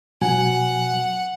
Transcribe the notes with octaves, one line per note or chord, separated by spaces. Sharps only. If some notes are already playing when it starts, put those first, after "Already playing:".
B2 F#3 F#5 G#5